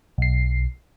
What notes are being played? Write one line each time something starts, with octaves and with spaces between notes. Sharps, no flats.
B1 C7